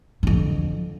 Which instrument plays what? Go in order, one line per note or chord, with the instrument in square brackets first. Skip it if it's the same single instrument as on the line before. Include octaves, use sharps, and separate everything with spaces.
[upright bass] F2 D3